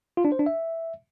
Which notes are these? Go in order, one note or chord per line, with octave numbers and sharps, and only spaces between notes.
F4
D4
C5
D4
E5